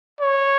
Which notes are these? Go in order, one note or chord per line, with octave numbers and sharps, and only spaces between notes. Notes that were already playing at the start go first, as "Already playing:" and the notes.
C#5